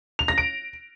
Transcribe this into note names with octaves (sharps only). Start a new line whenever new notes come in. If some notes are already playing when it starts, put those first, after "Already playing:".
F7
A#6
D7